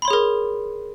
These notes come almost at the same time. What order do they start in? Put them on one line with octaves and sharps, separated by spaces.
B5 C6 C#5 G#4 A#4